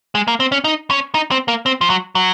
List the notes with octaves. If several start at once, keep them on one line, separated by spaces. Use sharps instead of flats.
G#3
A#3
C4
C#4
D#4
C#4
D#4
C4
A#3
C4
F3
F#3
F#3